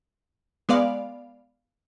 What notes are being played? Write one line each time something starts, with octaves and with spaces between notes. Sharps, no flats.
G#3 B3 D5 F5